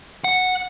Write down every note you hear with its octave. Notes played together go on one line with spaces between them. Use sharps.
F#5